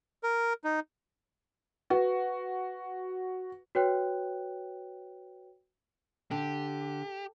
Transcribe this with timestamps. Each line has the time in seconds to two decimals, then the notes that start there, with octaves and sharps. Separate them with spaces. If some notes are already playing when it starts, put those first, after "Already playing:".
0.23 A#4
0.64 D#4
1.90 F#4 B4
3.75 F#4 B4 C#5 G5 F#6
6.31 D3 G4